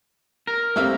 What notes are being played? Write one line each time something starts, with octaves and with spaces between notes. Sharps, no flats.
A#4
G3 A3 A#3 C4 E5 F5